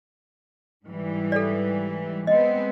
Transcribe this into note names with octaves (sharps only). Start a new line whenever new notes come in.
G#2 E3 G3
A4 D5
G#3 B3 C4 D#5